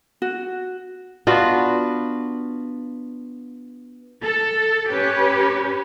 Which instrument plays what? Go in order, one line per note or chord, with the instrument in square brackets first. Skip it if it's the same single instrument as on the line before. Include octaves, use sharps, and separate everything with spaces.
[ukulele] F#4
[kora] B3 D4 F4 F#4
[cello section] A4
C#4 G4 B4 C#5